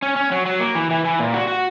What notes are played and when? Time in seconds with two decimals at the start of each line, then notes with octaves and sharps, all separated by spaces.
0.02 C#4
0.16 C#4
0.32 F#3
0.46 F#3
0.60 A#3
0.75 E3
0.90 E3
1.05 E3
1.19 A#2
1.34 F#4
1.48 F#4